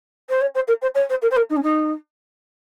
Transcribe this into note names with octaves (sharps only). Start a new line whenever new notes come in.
C5
C#5
C5
A#4
C5
C#5
C5
A#4
C5
A#4
D#4
C#4
D#4